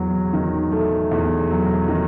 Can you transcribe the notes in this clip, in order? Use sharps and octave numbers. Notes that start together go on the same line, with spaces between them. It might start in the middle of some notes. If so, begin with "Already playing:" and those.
Already playing: E2 F#3
D#3
A3
E2
F#3
D#3